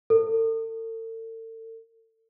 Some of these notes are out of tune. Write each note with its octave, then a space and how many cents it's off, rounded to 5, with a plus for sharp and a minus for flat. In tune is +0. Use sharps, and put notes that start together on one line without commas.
A4 +40